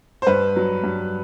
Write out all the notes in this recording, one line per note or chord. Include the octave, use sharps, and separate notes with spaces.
C5
G2 B4
F#3
G2